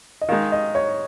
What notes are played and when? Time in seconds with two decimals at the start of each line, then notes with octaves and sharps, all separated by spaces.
0.21 D#5
0.29 D#3 G#3 D#4 F5
0.52 D#5
0.75 C#5